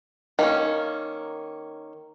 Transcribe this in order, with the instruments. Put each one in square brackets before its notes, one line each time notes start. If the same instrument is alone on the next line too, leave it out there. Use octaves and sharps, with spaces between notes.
[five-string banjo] D#3 A#3 C#4